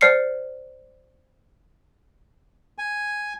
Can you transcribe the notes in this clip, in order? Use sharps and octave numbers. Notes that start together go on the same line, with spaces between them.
C5 D5 F6 C7 C#7
G#5